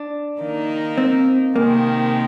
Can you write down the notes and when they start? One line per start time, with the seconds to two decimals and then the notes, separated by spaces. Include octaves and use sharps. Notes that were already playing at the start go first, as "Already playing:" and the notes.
Already playing: D4
0.41 D#3 A#3 D#4
0.98 C4
1.55 C3 D#3 G#3 A#3 C4